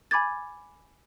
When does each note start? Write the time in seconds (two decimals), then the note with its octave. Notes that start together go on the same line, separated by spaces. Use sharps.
0.11 G#5 B5 D6 G#6 A6